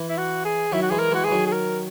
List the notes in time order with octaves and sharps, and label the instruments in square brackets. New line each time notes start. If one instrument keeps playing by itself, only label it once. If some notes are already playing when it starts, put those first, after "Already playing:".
Already playing: [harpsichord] E3
[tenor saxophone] E4
F#4
G#4
[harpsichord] D#3 F#3 [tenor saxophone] E4
[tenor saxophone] F#4
[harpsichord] E3 G#3 [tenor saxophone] G#4
[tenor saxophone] A#4
[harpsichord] E3 G#3 [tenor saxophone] F#4
[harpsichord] E3 [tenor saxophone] G#4
[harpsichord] D#3 F#3
[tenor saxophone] G#4
A#4